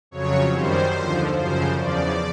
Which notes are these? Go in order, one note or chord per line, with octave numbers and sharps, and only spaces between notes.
F2 C#3 F#3 C#5
F#2 D#3 G3 C5
D#2 D3 F3
F#2 C#3 F3 C5
E2 C#3 F3 D5